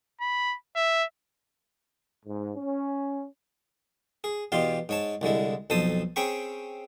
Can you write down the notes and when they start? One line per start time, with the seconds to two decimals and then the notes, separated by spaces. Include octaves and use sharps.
0.21 B5
0.76 E5
2.26 G#2
2.56 C#4
4.24 G#4
4.52 E2 B2 F4 G4 C6
4.89 G#2 C#5 A5
5.21 C2 D3 G#3 E4
5.70 B1 F2 A4 C5 A5 D#6
6.16 C4 C#4 G#4 G5 B5 C#6